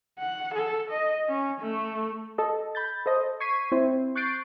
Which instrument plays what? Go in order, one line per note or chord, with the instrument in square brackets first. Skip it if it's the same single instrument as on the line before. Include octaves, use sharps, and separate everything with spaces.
[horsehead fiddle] F#5
A4
D#5
C#4
A3
[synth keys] A4 D#5
B5 G6 A6
A4 C5 D#5
C#6 G#6 B6 C7 D#7
C4 E4 C5
C#6 F#6 G6 A6 C7 D7